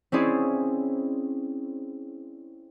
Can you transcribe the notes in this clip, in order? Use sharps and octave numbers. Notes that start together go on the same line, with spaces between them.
C4 C#4 E4 G#4 D5